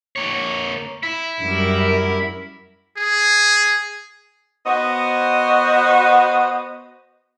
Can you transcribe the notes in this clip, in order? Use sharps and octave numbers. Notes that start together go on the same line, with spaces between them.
A#3 C#5
E4
F#2 G3 A#4
G#4
B3 F#4 C5 D#5